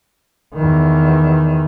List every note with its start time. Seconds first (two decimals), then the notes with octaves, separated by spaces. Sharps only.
0.55 E2 D#3